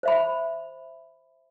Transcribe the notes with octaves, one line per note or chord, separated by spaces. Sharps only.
C5 E5 B5